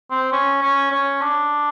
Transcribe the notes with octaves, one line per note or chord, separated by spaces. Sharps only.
C4
C#4
C#4
C#4
D4